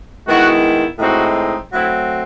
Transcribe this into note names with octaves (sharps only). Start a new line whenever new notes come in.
D#3 G#3 B3 E4 F#4
A2 E3 G#3 C4 D#4 F#4
F#3 A3 C4 E4